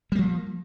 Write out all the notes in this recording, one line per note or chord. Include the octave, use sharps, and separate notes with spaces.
F3 G3 A#3